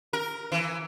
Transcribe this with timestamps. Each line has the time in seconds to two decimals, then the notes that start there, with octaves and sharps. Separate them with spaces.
0.13 A#4
0.52 E3